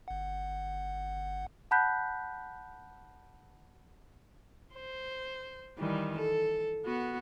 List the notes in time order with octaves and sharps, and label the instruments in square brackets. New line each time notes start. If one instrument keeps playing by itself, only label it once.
[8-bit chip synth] G1 F#5
[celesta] F#5 A5 B5 F#6 G6 B6
[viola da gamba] C5
D#3 E3 G3
A4
B3 F#4